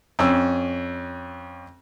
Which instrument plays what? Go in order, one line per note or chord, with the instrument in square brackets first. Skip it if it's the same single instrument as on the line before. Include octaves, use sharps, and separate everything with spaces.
[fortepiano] F2 C#4 E6